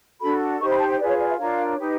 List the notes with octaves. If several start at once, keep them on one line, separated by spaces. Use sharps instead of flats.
D4 F#4 A4 B5
D#4 G4 C5 C#6
B5
A5
G5
F4 G#4 B4 D5
C#5
D5
E5
D4 F4 A#4 C#5 F5
D#4 G4 B4